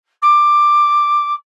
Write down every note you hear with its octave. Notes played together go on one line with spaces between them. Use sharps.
D6